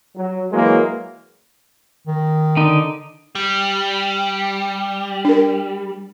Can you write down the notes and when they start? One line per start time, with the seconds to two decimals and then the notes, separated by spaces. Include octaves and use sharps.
0.16 F#3
0.52 E3 F#3 G#3 A#3
2.07 D#3
2.57 D3 D#4
3.35 G3
5.25 D4 A#4